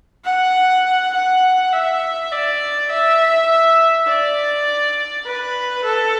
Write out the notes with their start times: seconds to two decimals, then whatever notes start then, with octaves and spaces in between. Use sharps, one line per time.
0.24 F#5
1.14 F#5
1.73 E5
2.32 D5
2.89 E5
4.08 D5
5.25 B4
5.84 A4